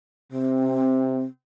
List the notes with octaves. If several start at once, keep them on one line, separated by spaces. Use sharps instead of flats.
C3 C4